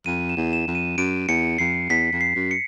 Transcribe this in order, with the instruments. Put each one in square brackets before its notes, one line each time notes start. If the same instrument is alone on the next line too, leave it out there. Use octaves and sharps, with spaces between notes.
[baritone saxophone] F2 [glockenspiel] D#7
[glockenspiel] E7
[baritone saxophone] E2
[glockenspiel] E7
[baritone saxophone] F2
[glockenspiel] D#7
[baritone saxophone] F#2 [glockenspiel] D7
[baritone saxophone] E2 [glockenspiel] C#7
[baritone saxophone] F2 [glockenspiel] C7
[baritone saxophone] E2 [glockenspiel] B6
[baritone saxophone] F2
[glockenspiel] C7
[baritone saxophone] F#2
[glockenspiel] C#7